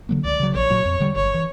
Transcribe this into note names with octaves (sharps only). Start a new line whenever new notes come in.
D3 F#3 A#3
C#2 D5
C#3 F#3
A#1 C#5
A#2 F#3
F2
D3 G3
G1 C#5
E3